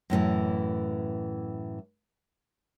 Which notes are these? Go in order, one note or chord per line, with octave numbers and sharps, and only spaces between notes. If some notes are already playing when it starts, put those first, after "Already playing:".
F#2 A2 D#3 E3